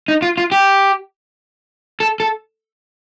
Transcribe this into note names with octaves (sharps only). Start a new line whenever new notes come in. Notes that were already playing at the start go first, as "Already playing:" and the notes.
D#4
F4
F4
G4
A4
A4